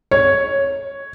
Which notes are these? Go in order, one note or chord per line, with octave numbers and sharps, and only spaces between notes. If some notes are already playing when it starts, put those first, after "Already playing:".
C#5